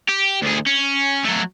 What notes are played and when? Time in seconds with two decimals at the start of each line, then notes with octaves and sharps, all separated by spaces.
0.08 G4
0.42 D2 G#4
0.67 C#4
1.25 F#3 A3